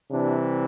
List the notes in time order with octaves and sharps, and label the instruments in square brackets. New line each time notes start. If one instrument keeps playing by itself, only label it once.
[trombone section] C3 E3 G3 D4